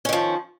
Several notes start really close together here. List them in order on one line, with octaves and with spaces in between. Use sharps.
C#4 D#3 F3